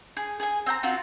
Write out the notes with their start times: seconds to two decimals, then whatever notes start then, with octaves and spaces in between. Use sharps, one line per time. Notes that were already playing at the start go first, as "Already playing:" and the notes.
0.17 G#4
0.40 G#4 G#5
0.66 C4 G5 A#5
0.83 C4 F4 F#4